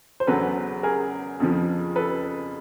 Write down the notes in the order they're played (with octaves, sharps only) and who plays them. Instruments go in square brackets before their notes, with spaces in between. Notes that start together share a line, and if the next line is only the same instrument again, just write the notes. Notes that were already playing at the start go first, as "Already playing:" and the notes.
[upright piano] C5
E2 C#3 F#3 A4 B4
G#4 A#4
F2 C#3 F3
A4 B4